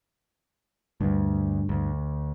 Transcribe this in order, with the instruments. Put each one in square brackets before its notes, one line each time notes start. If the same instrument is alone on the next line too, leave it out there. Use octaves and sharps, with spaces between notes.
[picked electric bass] D2 [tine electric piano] G2
[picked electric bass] D2